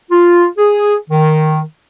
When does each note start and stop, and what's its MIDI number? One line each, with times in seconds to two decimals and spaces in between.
0.10 0.45 65
0.57 0.95 68
1.09 1.61 51